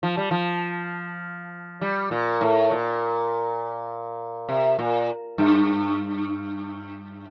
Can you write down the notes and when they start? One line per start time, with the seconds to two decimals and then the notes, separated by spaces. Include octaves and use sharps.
0.03 F3
0.17 G3
0.31 F3
1.81 G3
2.11 A#2
2.41 A2
2.71 A#2
4.49 C3
4.79 A#2
5.38 G2